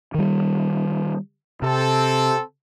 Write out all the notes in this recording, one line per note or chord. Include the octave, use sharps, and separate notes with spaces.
D#3 G3
C3 C4 A4